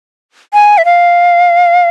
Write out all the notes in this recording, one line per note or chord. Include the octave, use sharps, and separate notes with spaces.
G#5
E5
F5